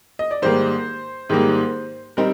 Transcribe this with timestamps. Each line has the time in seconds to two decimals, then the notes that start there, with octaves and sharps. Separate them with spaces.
0.19 D#5
0.31 D5
0.42 G#2 D#3 G3 A#3 C5
1.29 G#2 D#3 G3 A#3
2.17 G3 C4 D#4 A#4